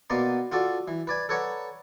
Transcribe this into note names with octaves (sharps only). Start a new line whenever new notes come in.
B2 A#3 B3 D5 A#5 C6
F4 F#4 A4 D5
E3
B4 D5 G#5
A4 B4 C#5 D5 F#5 A#5